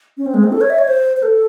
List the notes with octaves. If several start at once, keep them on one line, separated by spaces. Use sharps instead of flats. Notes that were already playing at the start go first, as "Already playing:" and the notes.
C#4
C4
G#3
C4
A4
C#5
E5
C#5
C5
C5
A4